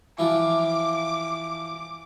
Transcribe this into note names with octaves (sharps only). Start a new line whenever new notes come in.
E3 F3 D6